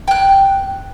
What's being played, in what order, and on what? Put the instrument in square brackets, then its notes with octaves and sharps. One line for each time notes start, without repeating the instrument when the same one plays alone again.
[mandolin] G5 F#6